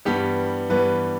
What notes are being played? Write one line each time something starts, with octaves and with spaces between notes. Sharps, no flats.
G2 E3 G3 B3 G4
G2 E3 G3 B3 B4